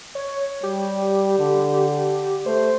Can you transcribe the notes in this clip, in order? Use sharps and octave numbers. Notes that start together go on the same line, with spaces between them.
C#5
G3 G4
D3
A3 C5